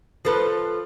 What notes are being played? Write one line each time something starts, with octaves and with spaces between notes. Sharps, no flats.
F3 A4 B4